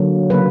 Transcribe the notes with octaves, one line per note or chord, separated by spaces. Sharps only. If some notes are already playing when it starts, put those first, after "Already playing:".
Already playing: D3 F#3 A#3
C#3 F#3 A#3 B4